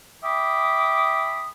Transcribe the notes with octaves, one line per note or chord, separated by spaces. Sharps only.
E5 G5 B5 D6 D#6